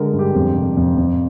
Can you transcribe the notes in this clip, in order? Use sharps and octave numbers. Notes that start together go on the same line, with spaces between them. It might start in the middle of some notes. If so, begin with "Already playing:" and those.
Already playing: D3 G#3 A#4
G2
G4
F2
C3
F2
F2